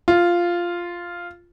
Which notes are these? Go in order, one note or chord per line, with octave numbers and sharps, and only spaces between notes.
F4